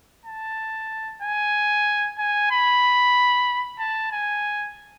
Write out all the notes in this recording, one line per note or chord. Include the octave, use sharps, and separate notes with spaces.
A5
G#5
G#5
B5
A5
G#5